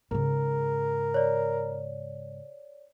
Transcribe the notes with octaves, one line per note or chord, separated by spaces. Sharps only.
G#2 C#3 A#4
C#5 D5